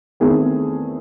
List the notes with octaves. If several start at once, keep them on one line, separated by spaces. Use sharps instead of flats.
E2 D#3 A3 C4 G#4